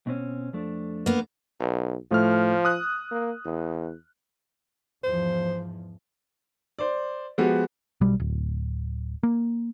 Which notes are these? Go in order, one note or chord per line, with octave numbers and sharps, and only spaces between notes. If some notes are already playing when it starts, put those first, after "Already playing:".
B2 C4 C#4
F2 A3 D4
A#3 B3
B1
A2 F3 A3 F6
D#6 F#6
A#3
E2
E2 G#2 F3 C5
C5 D5
F3 G#3 B3 F#4 G4
B1 B2 G3
D1
A#3